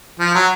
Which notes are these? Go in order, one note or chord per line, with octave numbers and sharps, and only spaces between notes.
F3
F#3